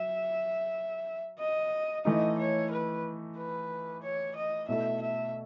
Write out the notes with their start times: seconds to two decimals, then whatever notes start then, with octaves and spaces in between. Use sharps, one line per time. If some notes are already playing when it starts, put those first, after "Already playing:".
Already playing: F#3 E5
1.39 D#5
2.05 E3 A3 D#4 D#5
2.38 C#5
2.70 B4
3.37 B4
4.02 C#5
4.35 D#5
4.68 B2 A3 E4 A4 E5
5.01 E5